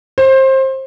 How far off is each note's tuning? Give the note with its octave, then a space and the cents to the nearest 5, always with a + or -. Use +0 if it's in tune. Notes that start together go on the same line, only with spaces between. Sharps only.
C5 +25